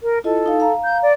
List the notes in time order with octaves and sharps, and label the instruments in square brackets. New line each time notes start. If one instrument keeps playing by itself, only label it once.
[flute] A#4
[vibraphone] E4 F4 D#5 [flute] A4
[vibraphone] D#4 F5
F5 A#5
[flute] G6
D5